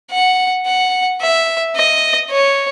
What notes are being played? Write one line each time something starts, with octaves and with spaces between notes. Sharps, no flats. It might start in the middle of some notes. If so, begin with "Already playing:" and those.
F#5
F#5
E5
D#5
C#5